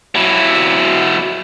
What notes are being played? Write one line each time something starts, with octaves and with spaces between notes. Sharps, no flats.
F#3 E4